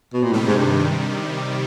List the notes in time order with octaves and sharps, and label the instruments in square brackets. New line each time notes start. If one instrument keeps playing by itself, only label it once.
[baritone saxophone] B2
A#2
[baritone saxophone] A2 [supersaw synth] C3 D#3 G3
[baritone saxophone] G#2
G2